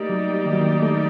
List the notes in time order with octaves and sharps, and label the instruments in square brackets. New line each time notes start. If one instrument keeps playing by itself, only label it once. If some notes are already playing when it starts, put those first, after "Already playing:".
Already playing: [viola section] G3 A#3 D#4 G4 D5 [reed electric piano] A3
[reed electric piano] F#3
D#3
F#3
D#3
A3